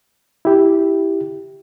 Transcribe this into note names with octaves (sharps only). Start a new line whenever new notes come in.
E4 G4